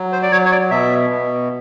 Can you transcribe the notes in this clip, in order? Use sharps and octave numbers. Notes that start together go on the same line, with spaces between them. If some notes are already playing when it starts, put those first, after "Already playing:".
Already playing: F#3
C5
D5
F#3 C#5
C#5
D5
B2 E5
B2